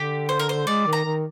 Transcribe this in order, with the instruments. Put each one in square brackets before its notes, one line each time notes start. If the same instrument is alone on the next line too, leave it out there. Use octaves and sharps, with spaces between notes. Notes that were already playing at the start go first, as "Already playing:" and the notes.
Already playing: [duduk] D3 [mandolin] G4
[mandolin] C5
A#4
C5
[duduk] G#3 [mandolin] D5
[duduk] D#3
[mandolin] A#5
[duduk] D#3